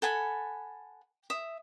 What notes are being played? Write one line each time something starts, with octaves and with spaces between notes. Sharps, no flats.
A4 F#5 G#5 B5
E5 D#6